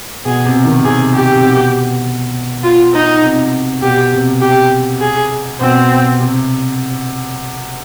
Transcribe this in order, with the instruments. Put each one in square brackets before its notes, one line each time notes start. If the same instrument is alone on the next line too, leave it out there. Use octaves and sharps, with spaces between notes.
[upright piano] B2 [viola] G#4
[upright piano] C3
D#3
[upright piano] C3 [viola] G#4
[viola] G4
[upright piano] C3
B2
[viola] F4
D#4
[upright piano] C3
[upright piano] B2 [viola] G4
[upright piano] C3
[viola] G4
G#4
[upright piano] B2 [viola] C4
[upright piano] C3